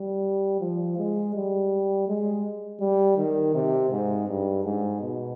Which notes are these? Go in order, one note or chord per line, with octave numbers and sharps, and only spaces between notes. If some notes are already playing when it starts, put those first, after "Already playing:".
Already playing: G3
F3
G#3
G3
G#3
G3
D#3
C3
G#2
G2
G#2
B2